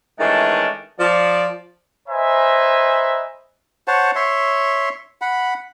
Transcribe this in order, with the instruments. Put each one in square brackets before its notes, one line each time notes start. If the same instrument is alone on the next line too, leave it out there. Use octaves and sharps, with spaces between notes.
[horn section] D#3 E3 G#3 A3 C#4 D4
F3 D5
[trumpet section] B4 C5 D#5 E5 G#5 A#5
[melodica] C5 C#5 F#5 A5
C#5 E5 C6
F#5 B5